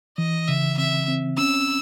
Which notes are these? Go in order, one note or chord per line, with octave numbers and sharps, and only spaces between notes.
E3 D#5
C#3 E5
C4 E5
C4
C#4 E6